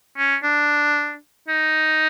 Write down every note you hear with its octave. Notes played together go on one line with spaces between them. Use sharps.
C#4
D4
D#4